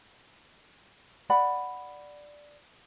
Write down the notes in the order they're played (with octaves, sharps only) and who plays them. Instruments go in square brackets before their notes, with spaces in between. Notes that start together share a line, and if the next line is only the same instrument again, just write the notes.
[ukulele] D5 F#5 B5